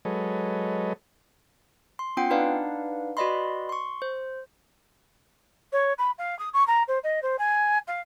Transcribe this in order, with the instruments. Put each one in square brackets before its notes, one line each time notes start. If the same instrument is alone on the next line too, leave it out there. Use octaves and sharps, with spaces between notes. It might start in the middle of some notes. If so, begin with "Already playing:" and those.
[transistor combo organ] F#3 G#3 A4 B4 C#5 D#5
[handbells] C6
B3 C#4 F4 F#5 G5 C7
D4 D#4 B4 D5 F5 F#5
F#4 B4 D5 D#5 B5 C6
C6 C#6
C5
[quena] C#5
B5
F5
D#6
C#6
A#5
C5
D#5
C5
G#5
F5